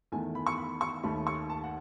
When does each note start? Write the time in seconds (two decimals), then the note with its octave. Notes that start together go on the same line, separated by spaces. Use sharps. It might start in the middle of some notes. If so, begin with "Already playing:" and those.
0.12 E2 D#3 A3 G#5
0.35 B5
0.47 C#6
0.58 B5
0.81 C#6
1.03 D#2 D#3 A3 B5
1.27 C#6
1.50 A5
1.64 F#5